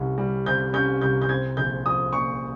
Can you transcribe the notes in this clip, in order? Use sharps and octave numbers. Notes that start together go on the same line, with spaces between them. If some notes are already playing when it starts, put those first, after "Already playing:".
Already playing: C2 C#4
G3
C3 G6
C#4 G6
C2 G6
G6
C4 G#6
A#1 G6
F3 D#6
A#2 C#6